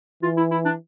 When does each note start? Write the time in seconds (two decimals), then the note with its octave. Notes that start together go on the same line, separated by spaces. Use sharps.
0.23 E3 F4
0.37 E4
0.51 E4
0.65 D4